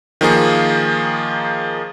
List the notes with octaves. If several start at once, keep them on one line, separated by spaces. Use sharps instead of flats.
D#3 F3 A#3 G#4